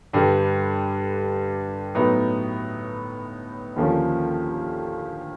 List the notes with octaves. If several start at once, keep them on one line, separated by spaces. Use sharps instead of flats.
G2 D3 G3
A2 F#3 B3 D#4
D#2 D3 F3 A#3 C#4